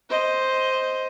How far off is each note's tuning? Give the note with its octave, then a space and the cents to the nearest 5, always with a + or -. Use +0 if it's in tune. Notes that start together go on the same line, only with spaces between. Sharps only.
C5 +0 D#5 +10